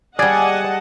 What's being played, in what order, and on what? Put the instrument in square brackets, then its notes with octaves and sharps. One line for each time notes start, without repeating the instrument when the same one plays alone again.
[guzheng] G3 G#4 [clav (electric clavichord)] D5 [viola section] D#5 F#5 A5 [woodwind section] G#5